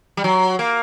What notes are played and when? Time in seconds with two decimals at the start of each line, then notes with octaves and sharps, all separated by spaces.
0.17 G3
0.24 F#3
0.59 A#3